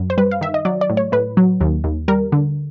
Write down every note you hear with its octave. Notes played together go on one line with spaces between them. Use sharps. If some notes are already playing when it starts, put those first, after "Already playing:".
Already playing: F#2
C5
G3 B4
F5
D#3 E5
D#5
F#3 D5
D5
A2
C#5
A2 B4
F#3
D#2
D#2
G3 A#4
D3